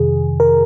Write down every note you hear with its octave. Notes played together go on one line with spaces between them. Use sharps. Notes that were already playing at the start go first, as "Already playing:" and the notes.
Already playing: F2 C3 D#3 G#4
A#4